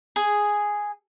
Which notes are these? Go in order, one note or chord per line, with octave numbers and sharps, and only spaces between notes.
G#4